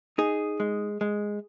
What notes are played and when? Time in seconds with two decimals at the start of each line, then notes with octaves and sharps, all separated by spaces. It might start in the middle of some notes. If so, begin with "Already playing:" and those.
0.18 D#4 G#4
0.60 G#3
1.01 G#3